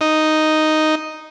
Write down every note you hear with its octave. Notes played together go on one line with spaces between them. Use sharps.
D#4